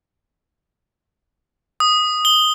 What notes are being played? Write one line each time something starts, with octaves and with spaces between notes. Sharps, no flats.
D#6
G7